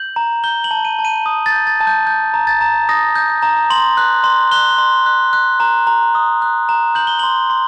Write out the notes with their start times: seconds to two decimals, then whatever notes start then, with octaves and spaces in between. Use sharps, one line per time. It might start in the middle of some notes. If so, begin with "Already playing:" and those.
Already playing: G6 F#7
0.16 A#5
0.44 G6 G7
0.64 F#7
0.71 A5
0.85 D#7
0.99 A5
1.05 D#7
1.26 D#6
1.46 A6
1.52 G6
1.67 A6
1.80 A5
1.87 G6
2.07 G6
2.34 A#5
2.47 A6
2.61 A#5
2.89 D#6 A#6
3.15 G6
3.43 A#5
3.70 C6 F#7
3.97 F#6
4.24 C6
4.51 F#6 G7
4.78 C6
5.06 F#6
5.33 F#6
5.60 A#5
5.87 A#5
6.15 D#6
6.42 F#6
6.69 A#5
6.95 G6 F#7
7.07 G7
7.19 C6 F#7
7.50 C6